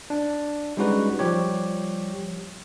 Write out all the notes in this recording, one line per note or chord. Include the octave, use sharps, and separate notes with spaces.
D4
G3 G#3 C#4 D#4 F#4 B4
F3 G3 G4 C#5